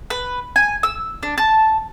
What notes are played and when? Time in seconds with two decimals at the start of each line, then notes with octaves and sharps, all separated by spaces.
0.10 B4
0.56 G#5
0.83 E6
1.23 D4
1.38 A5